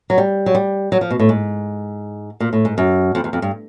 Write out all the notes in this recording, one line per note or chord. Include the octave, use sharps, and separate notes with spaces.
F#3
G3
F#3
G3
F#3
F3
B2
A2
G#2
A#2
A2
G#2
F#2
F2
E2
F2
G2